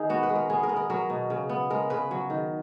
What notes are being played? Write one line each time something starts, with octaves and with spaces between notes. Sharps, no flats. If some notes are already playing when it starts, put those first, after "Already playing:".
Already playing: D#3 D#4 G#4
B3 F#4
B4
G#3
A#4
B3 G#4
A#4
B3
A#4
F#3 A#4
B2
C#3
B3
G#3 A#4
C#3 B4
F#3
D#3